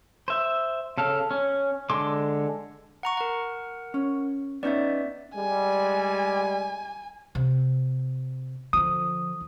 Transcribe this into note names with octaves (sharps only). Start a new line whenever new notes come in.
C5 E5
C#3 A4 F5
C#4
D3 G#3 C6 D6
F#5 A#5 C#6
A#4 F#5
C#4
B3 C#4 D#4 D5 E5
G3 G#3 G#5
C3
D3 F3 D#6